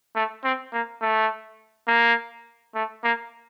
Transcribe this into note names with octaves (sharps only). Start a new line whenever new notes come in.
A3
C4
A#3
A3
A#3
A3
A#3